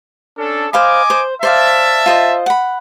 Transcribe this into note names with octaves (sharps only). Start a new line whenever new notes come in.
C#4 D4 A4
C5 D#5 F5 G#5 B5 D6
C5
C5 D5 E5 F5 A5
F4 C5 D#5
F#5 B5